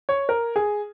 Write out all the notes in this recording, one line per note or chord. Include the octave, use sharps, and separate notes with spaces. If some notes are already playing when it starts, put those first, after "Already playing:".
C#5
A#4
G#4